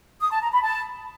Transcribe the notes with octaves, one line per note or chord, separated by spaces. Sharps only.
D#6
A5
A#5
B5
A5